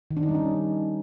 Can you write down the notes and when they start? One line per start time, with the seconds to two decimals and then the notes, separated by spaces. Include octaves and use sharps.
0.11 D#3
0.17 D4
0.23 D#4
0.29 G3
0.35 C#4